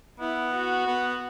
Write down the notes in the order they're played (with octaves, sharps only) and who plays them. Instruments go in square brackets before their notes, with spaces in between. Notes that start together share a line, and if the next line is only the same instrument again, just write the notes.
[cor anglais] B3 [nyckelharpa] E4
[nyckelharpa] F#4
[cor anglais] B3